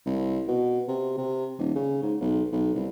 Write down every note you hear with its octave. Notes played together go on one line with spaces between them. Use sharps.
C2
B2
C3
C3
D#1
C#3
G#2
B1
B1
C2